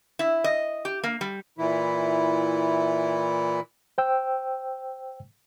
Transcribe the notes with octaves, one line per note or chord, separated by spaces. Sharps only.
E4
D#5
G4
A#3
G3
A#2 E3 E4
C5 G5 E6